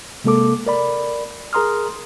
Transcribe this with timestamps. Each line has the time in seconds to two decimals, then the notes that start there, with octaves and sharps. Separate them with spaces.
0.24 C3 G#3 A#3 A4 D6
0.66 A#4 D5 B5
1.53 G#4 A#4 A#5 C6 D#6 F6